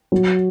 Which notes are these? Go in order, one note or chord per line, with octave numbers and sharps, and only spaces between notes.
F#3